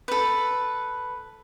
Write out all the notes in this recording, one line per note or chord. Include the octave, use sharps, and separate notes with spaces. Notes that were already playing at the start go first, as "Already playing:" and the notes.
A4 B4